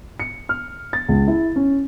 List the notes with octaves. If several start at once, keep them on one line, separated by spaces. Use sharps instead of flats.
C#7
F6
A6
C#2
E4
C#4